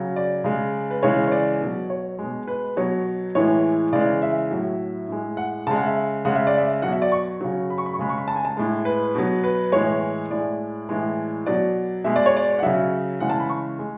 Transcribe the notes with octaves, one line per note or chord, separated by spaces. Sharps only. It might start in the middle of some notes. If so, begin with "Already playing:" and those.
Already playing: C#3 F#3
D5
C#3 G#3
B4
C#3 E3 G#3 C#5
C#5
D5
B2 F#3
C#5
B2 G#3
B4
B2 F#3 C#5
A2 E3 G#3 C#5
C#3 E3 G#3 D5
E5
A2 F#3
A2 G#3
F#5
C#3 G#3 A5
F#5
E5
C#3 G#3 F#5
E5
D5
E5
B2 F#3 F#5
E5
D5
C#6
C#3 F#3
B5
C#6
B5
C#6
C#3 G#3 B5
C#6
B5
A5
G#5
A5
A2 G#3
B4
B2 F#3
B4
A2 E3 G#3 C#5
A2 G#3 D5
A2 E3 G#3
B2 F#3 D5
B2 G#3 E5
D5
C#5
D5
F#5
C#3 F#3 E5
C#3 E3 G#3 F#5
A5
B5
C#6
G#3